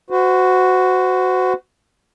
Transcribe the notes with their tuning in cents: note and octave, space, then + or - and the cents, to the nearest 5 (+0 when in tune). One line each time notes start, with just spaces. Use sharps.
F#4 +0 C5 -35